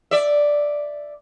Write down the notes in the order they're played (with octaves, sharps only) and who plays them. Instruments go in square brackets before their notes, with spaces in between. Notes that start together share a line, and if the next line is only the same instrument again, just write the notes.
[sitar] D5 E5